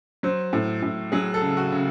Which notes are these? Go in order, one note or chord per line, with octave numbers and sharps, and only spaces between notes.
F#3 C5
A2
A2
F#3 G#4
A4
C#3
F#4
C#3